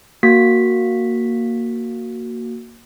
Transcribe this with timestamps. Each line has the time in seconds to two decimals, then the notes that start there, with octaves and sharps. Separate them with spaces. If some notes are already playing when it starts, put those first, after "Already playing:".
0.23 A#3 F#4 B6